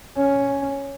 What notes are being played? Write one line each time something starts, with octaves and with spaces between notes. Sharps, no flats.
C#4